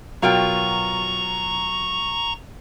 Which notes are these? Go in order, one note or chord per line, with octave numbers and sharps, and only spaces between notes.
B2 F#3 F4 A#4 G5 A#5 C#6